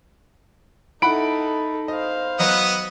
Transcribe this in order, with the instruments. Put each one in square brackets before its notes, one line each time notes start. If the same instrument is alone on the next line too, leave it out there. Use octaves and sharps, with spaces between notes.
[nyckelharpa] D#4 A4 [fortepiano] E4 F#5 [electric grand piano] B5 D7
[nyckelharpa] C5 F5 [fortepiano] D#5
[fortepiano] F#3 D#5 [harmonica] B3 F#5 D#6